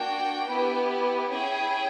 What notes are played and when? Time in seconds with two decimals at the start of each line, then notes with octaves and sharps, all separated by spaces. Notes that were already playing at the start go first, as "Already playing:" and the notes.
Already playing: A#3 D4 F#4 G5
0.47 B3 E4 G4
1.30 C#4 E4 G#4 G5